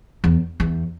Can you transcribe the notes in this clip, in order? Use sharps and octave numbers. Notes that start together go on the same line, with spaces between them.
E2
E2